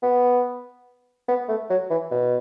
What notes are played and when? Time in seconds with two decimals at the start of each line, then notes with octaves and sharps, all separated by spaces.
0.03 B3
1.28 B3
1.49 A3
1.70 F#3
1.90 E3
2.11 B2